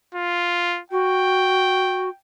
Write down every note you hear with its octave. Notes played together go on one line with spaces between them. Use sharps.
F4
F#4 G5